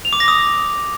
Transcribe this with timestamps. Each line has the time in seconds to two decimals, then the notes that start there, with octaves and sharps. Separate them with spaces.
0.05 F7
0.13 D6
0.20 A#6
0.28 D#6